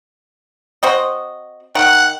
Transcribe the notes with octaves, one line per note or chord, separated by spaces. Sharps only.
C4 F#4 D#5
D#3 F#5